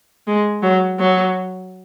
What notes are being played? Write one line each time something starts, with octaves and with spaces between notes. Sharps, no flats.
G#3
F#3
F#3